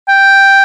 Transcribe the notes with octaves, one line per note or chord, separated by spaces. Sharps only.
G5